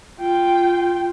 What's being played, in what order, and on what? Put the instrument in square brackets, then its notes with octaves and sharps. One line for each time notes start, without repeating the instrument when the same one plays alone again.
[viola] F4 G5